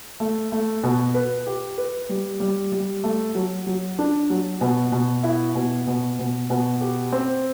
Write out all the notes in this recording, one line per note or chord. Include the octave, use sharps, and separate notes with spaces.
A3
A3
B2
B4
G4
B4
G3
G3
G3
A3
F#3
F#3
D4
F#3
B2
B2
E4
B2
B2
B2
B2
G4
C4